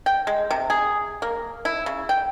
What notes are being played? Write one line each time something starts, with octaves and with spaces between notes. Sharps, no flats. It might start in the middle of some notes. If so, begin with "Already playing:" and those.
G5
G#3
C3
G#4
A#3
E4
C#3
G5